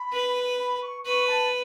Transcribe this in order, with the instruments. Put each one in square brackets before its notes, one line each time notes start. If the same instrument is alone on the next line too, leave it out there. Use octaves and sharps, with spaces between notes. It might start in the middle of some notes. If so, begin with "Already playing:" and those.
Already playing: [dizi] B5
[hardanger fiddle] B4
[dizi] B5
C#6
[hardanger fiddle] B4 [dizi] C#6
[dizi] A5